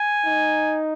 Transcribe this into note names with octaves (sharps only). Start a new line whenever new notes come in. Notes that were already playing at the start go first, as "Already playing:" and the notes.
Already playing: G#5
D#4